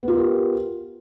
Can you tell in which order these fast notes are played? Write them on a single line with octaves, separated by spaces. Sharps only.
B3 F4 A#4 G4